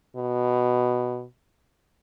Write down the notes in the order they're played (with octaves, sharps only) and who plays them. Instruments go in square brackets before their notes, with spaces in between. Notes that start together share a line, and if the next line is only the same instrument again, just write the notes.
[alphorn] B2